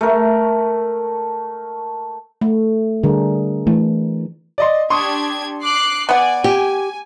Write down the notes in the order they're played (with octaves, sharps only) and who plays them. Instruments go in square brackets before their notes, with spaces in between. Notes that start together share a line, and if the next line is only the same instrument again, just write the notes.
[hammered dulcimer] A3 A#4
[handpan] A3
[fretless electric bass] D3 G3 [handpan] D4 G#4 A#4
[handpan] E3 [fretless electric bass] A3
[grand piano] D5 D#5 C6
[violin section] D4 G4 G#6 [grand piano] C6 C#6 D#6
[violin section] D6 F#6 C7
[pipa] B3 F#5 [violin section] D5 G#5
[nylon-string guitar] G4 [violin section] G#5